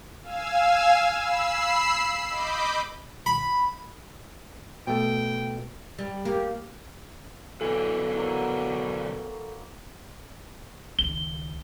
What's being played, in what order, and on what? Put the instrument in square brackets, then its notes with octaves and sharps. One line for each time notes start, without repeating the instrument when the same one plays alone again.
[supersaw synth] F5 G#5 E6
B5 E6 C7
D#5 B5 D6 G6
[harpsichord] B5
[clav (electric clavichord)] B2 A3 [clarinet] G5
[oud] G3
[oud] A#3 [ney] G4
[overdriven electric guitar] B1 D3 [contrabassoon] B2 [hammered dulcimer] E3 [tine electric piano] A4
[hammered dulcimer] E3 F#3 A#3
[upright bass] C#2 D#3 [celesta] G7